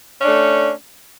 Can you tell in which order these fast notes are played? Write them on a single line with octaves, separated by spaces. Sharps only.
C#4 D4 A3